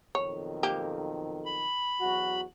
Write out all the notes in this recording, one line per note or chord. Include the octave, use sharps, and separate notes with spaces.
B1 F2 D#3 C#5
A#3 G4
B5
E2 F#3 F#4